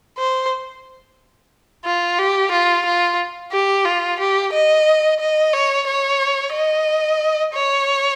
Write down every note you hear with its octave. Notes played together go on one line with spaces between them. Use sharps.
C5
F4
G4
F4
F4
G4
F4
G4
D#5
D#5
C#5
C#5
D#5
C#5